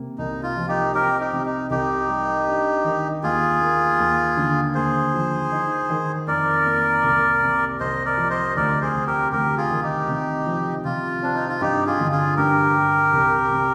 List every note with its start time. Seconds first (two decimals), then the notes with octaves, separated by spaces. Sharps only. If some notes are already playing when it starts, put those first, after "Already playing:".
Already playing: C3 A#3
0.18 C2 D#4
0.43 F4
0.57 F3
0.68 D#4 G4
0.94 C4 G4 A#4
1.20 D#4 G4
1.33 C3
1.46 D#4
1.70 C2 D#4 G4
2.09 G3
2.47 D4
2.84 D#3
3.23 D#2 F4 G#4
3.61 A#3
3.99 D#2
4.37 D3
4.75 D#2 G#4 C5
5.14 F3
5.52 D#4
5.90 D#3
6.27 F2 A#4 D5
6.66 A#3
7.04 C2
7.42 C3
7.80 C2 C5 D#5
8.05 A#4 D5
8.17 F3
8.30 C5 D#5
8.56 D2 A#4 D5
8.81 G#4 C5
8.94 C3
9.07 G4 A#4
9.32 D2 G4 A#4
9.57 F4 G#4
9.70 D#3
9.82 D#4 G4
10.08 C3
10.47 F3
10.85 C3 F4
11.23 C4 D4
11.35 D#4
11.49 F4
11.61 G2 D#4 G4
11.86 F4 G#4
12.00 D3
12.11 F4 G#4
12.36 G2 G4 A#4
12.75 G3
13.13 C2
13.51 C3